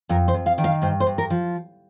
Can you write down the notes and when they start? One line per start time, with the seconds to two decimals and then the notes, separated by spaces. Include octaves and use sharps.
0.09 F2 A#4
0.28 C5
0.34 F2
0.46 F5
0.58 D#3
0.64 F5
0.82 G2 C5
1.00 C5
1.06 G2
1.18 A#4
1.30 F3